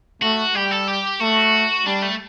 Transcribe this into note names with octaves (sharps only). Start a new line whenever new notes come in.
A3 F#4
G3 G4
A4
G4
A3 F#4
G3 D4
A3